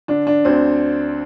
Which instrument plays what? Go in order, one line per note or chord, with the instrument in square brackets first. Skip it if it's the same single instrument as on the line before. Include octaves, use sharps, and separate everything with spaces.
[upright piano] D3 D4
D4
D2 C4